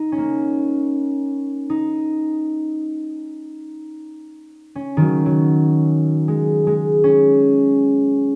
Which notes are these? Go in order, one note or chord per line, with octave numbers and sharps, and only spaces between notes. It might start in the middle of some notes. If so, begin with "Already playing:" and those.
Already playing: D#4
C#4
A#3
D#4
C#4
D#3 F#3
F#3
G#3
G#3
C#4